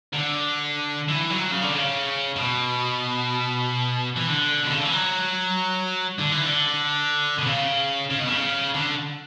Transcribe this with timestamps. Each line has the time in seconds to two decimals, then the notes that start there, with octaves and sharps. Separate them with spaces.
0.13 D3
1.09 E3
1.30 F#3
1.51 C#3
1.62 D3
1.74 C#3
2.36 B2
4.16 E3
4.27 D3
4.63 B2
4.70 C#3
4.78 D3
4.85 E3
4.91 F#3
6.19 D3
6.31 E3
6.43 D3
7.38 B2
7.46 C#3
8.10 C#3
8.19 B2
8.27 C#3
8.75 D3